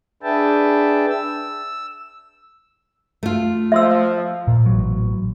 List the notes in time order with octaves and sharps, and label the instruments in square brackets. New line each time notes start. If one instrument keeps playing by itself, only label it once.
[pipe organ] D4 G#4 B4 E5 G5 A5
E6
[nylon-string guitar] A3 F4
[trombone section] F3 [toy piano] E5 C6 E6
[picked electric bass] A#2
A1 F#3